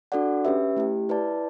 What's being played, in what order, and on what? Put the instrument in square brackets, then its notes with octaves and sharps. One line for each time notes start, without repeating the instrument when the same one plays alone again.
[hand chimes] D4 F#4 A4 D5 F#5
C#4 G4 B4 E5
A3 E4 G4
E4 B4 D5 A5